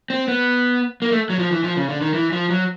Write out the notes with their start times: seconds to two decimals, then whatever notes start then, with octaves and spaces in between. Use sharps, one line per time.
0.10 C4
0.28 B3
1.02 A#3
1.12 A3
1.30 F#3
1.39 F3
1.52 E3
1.64 F3
1.77 C#3
1.89 D3
2.01 D#3
2.14 E3
2.32 F3
2.50 F#3